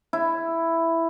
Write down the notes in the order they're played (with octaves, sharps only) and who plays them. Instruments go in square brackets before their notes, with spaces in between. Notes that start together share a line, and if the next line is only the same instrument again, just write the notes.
[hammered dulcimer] E4